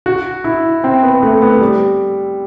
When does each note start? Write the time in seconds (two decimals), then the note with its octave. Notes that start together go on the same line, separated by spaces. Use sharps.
0.06 F#4
0.44 E4
0.84 C4
1.03 B3
1.23 A3
1.42 B3
1.61 G3